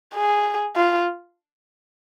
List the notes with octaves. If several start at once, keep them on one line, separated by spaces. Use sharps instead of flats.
G#4
F4